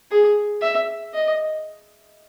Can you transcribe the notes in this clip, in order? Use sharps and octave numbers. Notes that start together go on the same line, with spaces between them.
G#4
E5
D#5